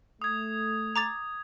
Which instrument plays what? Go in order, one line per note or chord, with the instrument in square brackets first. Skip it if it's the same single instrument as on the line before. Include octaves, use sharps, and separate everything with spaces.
[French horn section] A3 [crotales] D#6 G#6
[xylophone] A#5 D6 A6